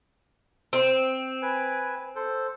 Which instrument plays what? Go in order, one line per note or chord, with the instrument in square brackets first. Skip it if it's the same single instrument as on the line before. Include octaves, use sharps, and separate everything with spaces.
[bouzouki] C4
[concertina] B4 G#5
A4 C5